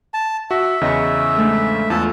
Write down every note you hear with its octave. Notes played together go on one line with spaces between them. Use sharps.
A5
F#4 E5
E2 C#3 D#5 A#5 C#6
G#2 A3 D4
E2 F4 A4 F#5 A5